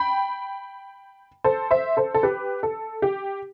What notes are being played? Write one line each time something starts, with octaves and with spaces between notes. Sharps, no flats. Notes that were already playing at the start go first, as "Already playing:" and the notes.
Already playing: G5 B5
A4 C5
C5 E5
A4 C5
A4
G4 B4
A4
G4